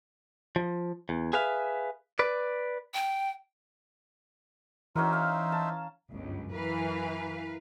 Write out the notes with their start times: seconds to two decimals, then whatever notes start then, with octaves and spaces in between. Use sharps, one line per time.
0.56 F3
1.09 E2
1.33 G#4 B4 E5 F5
2.19 B4 D5
2.94 G5
4.96 E3 C#4 D#4 F#4 A#4 C5 E5
5.13 F5
5.52 A5
6.11 G1 C#2 F#2
6.53 E3 A#4 B4 F5